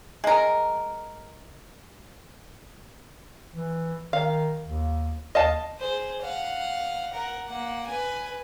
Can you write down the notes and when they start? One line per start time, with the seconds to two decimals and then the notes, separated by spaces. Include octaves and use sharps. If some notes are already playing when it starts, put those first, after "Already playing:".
0.24 G#3 A#4
3.54 E3
4.13 D#3 F5
4.65 D#2
5.35 D#2 D#5 F5 A5
5.79 G#4 C5
6.22 F5 F#5
7.13 A#4 F#5
7.47 A#3 F#5
7.87 B4 G#5